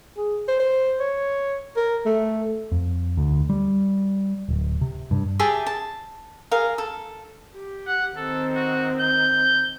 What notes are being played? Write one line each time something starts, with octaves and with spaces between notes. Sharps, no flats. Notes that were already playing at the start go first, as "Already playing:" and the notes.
G#4
C5
C5
C#5
A#4
A3
F2
D2
G3
D1
C3
G2
G4 G#4 E5 A5
A5
G#4 A#4 F5
A4
G4
F#5
D#3 C4 A4
F#4
G6